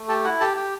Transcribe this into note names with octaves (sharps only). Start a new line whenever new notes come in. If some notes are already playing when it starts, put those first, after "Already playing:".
Already playing: A3
G4 A4 A5
E4 F#4 F#5
G4 A4 A5
G4